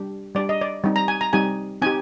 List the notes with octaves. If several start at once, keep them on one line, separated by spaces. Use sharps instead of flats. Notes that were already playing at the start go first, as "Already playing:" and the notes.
Already playing: G3 D4 G4
G3 D4 G4 D5
D#5
D5
G3 C4 D#4 G4
A#5
G#5
A#5
G3 C4 D#4 G4 G#5
C4 D#4 G4 G#5